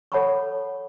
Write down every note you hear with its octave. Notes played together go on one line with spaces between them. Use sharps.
A4 C#5 F#5 A5 B5 C#6